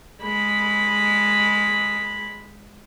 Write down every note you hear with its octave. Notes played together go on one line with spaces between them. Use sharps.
G#3 B5